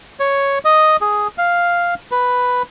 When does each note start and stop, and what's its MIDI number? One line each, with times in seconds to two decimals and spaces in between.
0.20 0.59 73
0.65 0.97 75
1.01 1.28 68
1.38 1.95 77
2.11 2.63 71